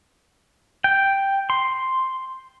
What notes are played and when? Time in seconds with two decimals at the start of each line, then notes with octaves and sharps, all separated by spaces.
0.84 G5
1.50 C6